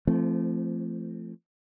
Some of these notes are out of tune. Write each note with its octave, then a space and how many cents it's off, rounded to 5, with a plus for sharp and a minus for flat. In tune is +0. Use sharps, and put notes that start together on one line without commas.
F3 -30 A3 +0 C4 +0